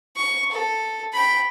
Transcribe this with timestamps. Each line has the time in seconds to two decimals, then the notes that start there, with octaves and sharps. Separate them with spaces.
0.16 C#6
0.51 A4
1.13 G5 B5